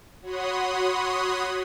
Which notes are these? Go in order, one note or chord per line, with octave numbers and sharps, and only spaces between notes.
F#4 C#5 F#5 B5 C6 D#6